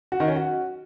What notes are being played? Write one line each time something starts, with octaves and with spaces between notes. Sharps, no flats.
F#4
D#3
C#4
F#4